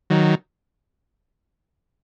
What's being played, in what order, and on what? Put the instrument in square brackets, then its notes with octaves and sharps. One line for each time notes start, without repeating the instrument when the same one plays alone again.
[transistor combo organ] D#3 F#3